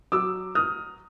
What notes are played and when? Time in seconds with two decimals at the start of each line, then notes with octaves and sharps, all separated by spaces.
0.12 F#3 D6 E6
0.55 D#6 F6